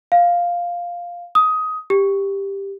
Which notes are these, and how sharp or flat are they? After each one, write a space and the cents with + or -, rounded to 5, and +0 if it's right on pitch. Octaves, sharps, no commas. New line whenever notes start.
F5 +0
D#6 +15
G4 +10